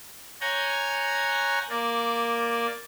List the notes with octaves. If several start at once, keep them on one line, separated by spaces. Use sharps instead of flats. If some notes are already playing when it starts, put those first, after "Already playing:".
C#5 F#5 G#5 A#5 G6 G#6
A#3 D5